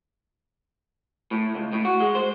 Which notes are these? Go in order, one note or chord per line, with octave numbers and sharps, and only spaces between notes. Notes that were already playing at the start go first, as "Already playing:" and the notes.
A2
C#2
A2
F#4
G#3
C5